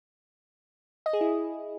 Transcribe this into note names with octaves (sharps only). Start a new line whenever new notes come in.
D#5
G#4
E4